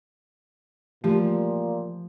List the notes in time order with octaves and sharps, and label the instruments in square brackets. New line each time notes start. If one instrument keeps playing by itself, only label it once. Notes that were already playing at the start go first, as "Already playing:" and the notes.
[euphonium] A#2 [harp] F3 [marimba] A3 G4